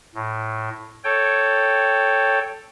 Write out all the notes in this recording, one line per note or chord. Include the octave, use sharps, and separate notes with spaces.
A2
A4 C#5 G5